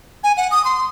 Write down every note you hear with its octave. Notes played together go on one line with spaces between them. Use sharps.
G#5
F#5
D#6
C6